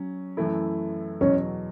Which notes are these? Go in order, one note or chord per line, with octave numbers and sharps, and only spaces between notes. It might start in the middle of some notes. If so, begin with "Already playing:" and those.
Already playing: F#3 C#4
F#2 E3 A3 E4
E2 B2 F#3 C#4